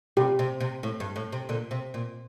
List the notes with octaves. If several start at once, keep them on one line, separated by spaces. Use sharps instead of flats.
C3 G4
C3
C3
A2
G2
A2
C3
A#2 D3
C3
A#2